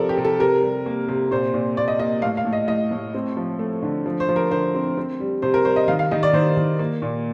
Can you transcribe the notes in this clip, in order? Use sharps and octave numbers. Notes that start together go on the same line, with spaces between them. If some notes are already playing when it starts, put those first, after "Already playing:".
Already playing: C3 F3 C4 A4 A#4 D5
G4
C3
A4
C3 A#4
G3
A#3
C3
A#2 C5
A#2
A#2 D5
D#5
A#3 D#5
A2 F5
F5
A2
D#5
A2 D#5
A2
C4
F3
A3
D3
F3
C5
F3
A#4
D3 C5
C4
C4
G3
C3 C5
A#4
G3 C5
D#5
D#3 F5
F5
D#3 D#5
D5
D#3 C5
D#3
A#3
A#2